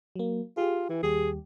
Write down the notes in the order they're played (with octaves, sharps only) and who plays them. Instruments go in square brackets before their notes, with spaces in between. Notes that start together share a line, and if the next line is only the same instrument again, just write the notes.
[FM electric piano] F#3 A#3
[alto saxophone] F4 [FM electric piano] G4 G#4
[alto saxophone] E3
[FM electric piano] D#2 G3 G4 [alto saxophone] G#4